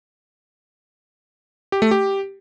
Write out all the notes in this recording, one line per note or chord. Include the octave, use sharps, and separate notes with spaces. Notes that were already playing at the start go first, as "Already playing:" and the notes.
G4
A3
G4